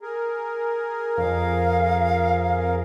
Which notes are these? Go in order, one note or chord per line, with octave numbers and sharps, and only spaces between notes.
G#4 A#4
F2 F5